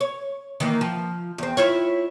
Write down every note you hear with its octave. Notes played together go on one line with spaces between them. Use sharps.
C#5
D#3 E3 A#3
F3
E2 C4
E4 F4 C#5